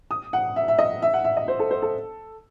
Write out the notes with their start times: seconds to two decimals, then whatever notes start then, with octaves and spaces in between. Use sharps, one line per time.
0.11 D#6
0.33 F#5
0.56 E5
0.68 E5
0.79 D#5
1.02 E5
1.14 F#5
1.25 E5
1.37 D#5
1.48 C5
1.59 A4
1.71 C5
1.82 A4